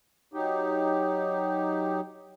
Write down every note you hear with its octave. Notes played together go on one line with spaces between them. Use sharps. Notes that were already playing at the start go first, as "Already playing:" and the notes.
F#3 D#4 G4